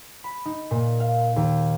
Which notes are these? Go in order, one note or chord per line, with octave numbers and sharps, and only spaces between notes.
B5
D#4
A#2
F5
D#2